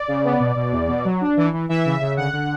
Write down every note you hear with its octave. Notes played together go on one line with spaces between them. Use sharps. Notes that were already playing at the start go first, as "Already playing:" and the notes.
Already playing: D5
C#3
B3
B2
B2
E2
B2
F#3
D4
E3
E3
E3 E5
C#3
C#3
D3 F#5
D3